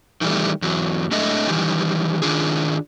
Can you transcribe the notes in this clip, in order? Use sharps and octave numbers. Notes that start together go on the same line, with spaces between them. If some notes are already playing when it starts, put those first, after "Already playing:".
D#3 E3 F#3 G3 A3
E2 F#3
G#3 A3 D4 A4 D#5 E5
D#3 E3 G3
D#3 D4 F4 G#4